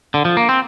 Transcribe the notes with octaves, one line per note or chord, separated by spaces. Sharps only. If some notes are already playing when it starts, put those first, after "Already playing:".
D3
F3
A#3
C4